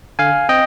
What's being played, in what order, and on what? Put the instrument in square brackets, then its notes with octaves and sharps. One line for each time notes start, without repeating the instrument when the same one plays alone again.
[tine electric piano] D3 F5 G#5
C4 D#5 G5